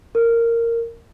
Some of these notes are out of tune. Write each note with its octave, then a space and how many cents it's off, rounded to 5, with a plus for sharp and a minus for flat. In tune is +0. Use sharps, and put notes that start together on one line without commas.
A#4 -10